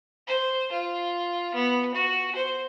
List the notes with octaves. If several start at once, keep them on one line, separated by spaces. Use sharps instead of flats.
C5
F4
B3
F#4
C5